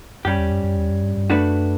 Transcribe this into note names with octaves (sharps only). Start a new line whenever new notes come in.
F#2 G3 C#4 G4
E2
F#2
F#2
E2
F#2
G2
G2
F#2 A3 D4 F#4 B4